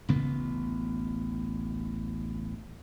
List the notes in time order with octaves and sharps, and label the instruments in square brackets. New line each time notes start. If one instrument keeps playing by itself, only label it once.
[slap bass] A1 D2 C#3 B3